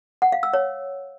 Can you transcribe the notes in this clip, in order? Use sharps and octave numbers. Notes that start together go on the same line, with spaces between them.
F#5
F5
E6
C#5